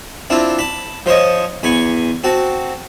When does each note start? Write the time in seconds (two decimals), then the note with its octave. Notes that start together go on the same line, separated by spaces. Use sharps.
0.30 C4 D4 E4 F4
0.59 A5 B5
1.06 F3 C5 C#5 D#5
1.63 E2 G#5 B5 C#6
2.24 C4 F#4 A5